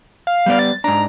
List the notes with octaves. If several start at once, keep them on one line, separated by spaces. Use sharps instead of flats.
F5
G3 B3 D5
A6
G#2 D4 A#5